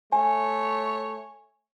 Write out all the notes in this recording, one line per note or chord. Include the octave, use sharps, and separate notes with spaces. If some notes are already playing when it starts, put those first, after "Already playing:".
A3 C#5 G#5